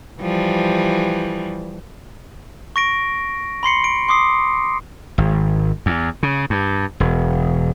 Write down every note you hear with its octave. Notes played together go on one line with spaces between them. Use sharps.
E3 F3 G3
C#6 A#6 D7
B5 C6 C7 C#7
D7
C6 D6 D#6 C7
G#1
E2
C#3
G2
E1